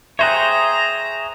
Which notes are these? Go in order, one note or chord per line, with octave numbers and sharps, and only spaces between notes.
G#4 C5 C#5 E5 G5 A#5 F#6